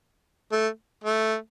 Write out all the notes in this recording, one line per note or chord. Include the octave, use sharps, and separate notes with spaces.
A3
A3